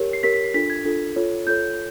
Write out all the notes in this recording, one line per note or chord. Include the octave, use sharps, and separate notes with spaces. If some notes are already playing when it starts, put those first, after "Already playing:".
Already playing: G4 A#4 C#5
C7
G4 A#4 C#5 B6
B6
C7
D4 F4 A4 B6
G#6
D4 F4 A4
F4 A4 C#5
F4 A4 C#5 G6